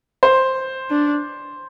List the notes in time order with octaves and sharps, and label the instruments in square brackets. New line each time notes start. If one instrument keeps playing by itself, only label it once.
[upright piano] C5
[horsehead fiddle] D4